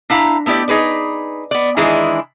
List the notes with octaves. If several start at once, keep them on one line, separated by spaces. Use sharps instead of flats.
D4 E4 F5 A#5
A3 B3 E4 G4 D5
D#4 G#4 B4 D5
B3 D5
D#3 E3 G#3 D4 E4 G#4